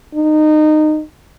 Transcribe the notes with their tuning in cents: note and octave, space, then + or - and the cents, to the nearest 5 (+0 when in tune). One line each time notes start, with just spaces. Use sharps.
D#4 -20